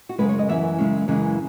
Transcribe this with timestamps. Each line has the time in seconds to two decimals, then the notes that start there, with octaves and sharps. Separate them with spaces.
0.09 F#4
0.18 F#2 C#3 G#3 B4
0.29 C#5
0.39 D#5
0.49 F#2 E3 B3 E5
0.78 F#2 C#3 G#3 C#4
1.08 F#2 C#3 E3 G#3